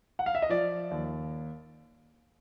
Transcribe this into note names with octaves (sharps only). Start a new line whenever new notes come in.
F#5
F5
E5
D#5
F3 D5
D#2